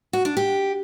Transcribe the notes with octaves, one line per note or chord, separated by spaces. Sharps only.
F#4
D4
G4